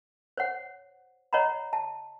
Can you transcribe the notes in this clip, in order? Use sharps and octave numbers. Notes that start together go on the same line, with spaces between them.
C5 C#5 F#5
C#5 D#5 F#5 A#5 B5
A5